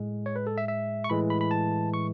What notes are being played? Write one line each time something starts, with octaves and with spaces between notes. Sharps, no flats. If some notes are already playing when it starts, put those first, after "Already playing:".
Already playing: A2 G#3
C#5
B4
A4
E5
E5
C#6
A2 E3 G#3 B5
B5
B5
A5
C#6